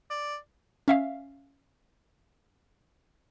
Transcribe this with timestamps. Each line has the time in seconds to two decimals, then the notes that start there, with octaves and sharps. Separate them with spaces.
0.10 D5
0.88 C#4 E5 F5